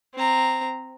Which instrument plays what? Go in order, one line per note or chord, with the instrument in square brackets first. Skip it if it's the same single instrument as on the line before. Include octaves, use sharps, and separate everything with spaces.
[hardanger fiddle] C4 A#5